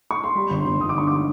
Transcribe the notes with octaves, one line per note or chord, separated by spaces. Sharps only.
C#6
C6
G3 B5
G1
C6
G1
G1 D#6
D6
D3 C#6
D6